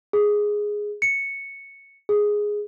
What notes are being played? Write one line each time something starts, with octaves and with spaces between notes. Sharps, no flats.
G#4
C#7
G#4